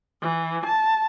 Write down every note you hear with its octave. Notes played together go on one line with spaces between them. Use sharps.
E3
A5